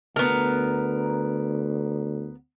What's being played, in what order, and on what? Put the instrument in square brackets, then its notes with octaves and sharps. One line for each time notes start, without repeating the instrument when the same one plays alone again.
[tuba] D2 [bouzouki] B3 A#4